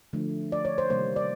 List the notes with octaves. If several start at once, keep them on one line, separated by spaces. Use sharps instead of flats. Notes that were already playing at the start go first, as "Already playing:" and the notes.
D3 F3 A3
D5
C#5
C5
C3 D#3 G3 A#3 C5
D5